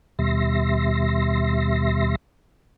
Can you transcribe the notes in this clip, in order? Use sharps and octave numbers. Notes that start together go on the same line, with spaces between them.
D#2 B2 G3 E5 C6 A#6